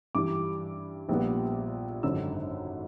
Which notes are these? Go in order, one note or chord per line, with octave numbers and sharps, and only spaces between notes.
G2 E3 G3 D6
A#1 A#2 G3 B3
G#1 F#2 D3 E6